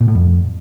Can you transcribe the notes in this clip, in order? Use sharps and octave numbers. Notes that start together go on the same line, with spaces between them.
A#2
A2
F2